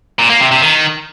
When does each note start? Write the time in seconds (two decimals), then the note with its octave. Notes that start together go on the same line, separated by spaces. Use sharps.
0.19 A#2
0.30 A#3
0.41 C3
0.51 C3
0.62 D#3